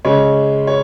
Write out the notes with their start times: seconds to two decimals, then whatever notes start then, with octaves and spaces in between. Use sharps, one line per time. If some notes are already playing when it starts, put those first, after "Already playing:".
0.05 C#3 G#3 C#5
0.67 C#5